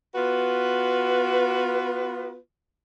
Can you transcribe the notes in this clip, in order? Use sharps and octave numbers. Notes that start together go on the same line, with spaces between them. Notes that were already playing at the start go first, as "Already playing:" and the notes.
B3 F4 F#4 B4